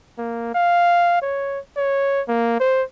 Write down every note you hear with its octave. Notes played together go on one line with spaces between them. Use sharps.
A#3
F5
C#5
C#5
A#3
C5